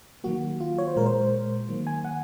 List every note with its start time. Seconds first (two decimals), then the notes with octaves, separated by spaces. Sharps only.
0.24 D#3 F#3 A#3 F#4
0.60 F4
0.78 C#5
0.87 C5
0.96 A#2 G#3 A#4
1.06 C5
1.69 D#3 F#3 A#3
1.87 G#5
2.05 F#5